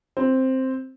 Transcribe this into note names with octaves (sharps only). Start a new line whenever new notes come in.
C4